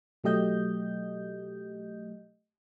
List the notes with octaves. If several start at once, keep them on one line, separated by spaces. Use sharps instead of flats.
B2 F#3 A3 G4 D#5 G6